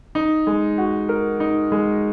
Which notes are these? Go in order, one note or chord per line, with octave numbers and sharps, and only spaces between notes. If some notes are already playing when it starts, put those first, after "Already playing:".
D#4
G#3
F#4
A#4
D#4
G#3